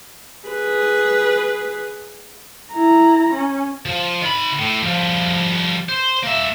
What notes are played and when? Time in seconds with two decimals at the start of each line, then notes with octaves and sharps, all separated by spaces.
0.49 G#4 B4
2.72 E4 A#5
3.34 C#4
3.86 F3
4.22 D#3 B5
4.59 A2
4.83 F3 G3
5.89 C5
6.24 A#3 E5